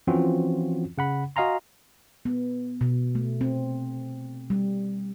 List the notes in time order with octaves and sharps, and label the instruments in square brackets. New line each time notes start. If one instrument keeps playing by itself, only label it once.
[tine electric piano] E3 F3 C4 C#4 F4 F#4
C#3 F#5 B5
F#4 D#5 F5 G#5 A#5 C6
[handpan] B3
B2
A3
C4
G3